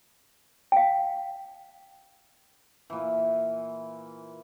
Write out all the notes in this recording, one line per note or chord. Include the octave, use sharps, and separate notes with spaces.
F5 G5
A#2 E3